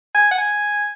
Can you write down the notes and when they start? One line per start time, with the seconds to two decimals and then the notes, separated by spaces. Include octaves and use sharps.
0.15 G#5
0.31 F#5
0.38 G#5